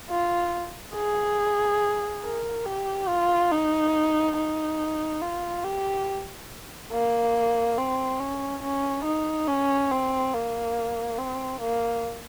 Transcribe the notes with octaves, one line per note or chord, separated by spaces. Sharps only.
F4
G#4
A#4
G4
F4
D#4
D#4
F4
G4
A#3
C4
C#4
C#4
D#4
C#4
C4
A#3
C4
A#3